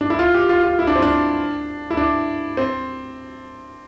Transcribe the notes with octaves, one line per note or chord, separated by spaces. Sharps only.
D4
E4
F4
G4
F4
F4
E4
D4
C4
D4
E4
D4
C4